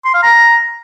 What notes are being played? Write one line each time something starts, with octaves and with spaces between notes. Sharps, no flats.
C6
F5
A#5